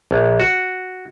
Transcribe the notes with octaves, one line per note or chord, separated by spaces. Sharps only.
A#1
F#4